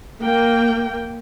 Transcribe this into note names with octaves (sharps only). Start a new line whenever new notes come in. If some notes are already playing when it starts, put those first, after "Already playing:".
A#3 G5